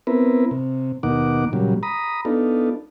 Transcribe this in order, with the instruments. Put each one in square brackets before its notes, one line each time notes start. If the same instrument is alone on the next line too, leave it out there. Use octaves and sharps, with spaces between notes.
[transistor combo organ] B3 C4 E4 A#4 B4
C3
D#2 B2 A#3 D#4 F#5 D6
A#2 C#3 F#3 G3
A#5 B5 D#6
B3 D4 D#4 F4 A4